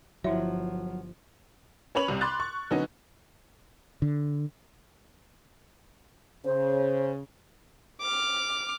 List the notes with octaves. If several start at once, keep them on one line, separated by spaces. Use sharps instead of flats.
G1 F3 F#3 E4 E5
C#4 B4 C#5 B5 F7 F#7
C2 C3
B5 C6 D6 F#6 A6
C#6
D3 F#3 B3 C#4 D#4
D3
C#3 C5
D6 F6